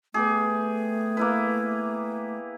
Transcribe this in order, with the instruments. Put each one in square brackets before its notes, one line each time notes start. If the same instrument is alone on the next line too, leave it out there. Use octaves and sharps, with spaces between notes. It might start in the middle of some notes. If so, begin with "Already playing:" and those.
[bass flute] A3 [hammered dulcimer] B3 G4 G#4
[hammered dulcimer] A#3 E4 B4